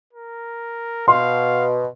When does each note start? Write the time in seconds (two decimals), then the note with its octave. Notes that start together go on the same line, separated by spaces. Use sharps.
0.13 A#4
1.08 B2 F5 C6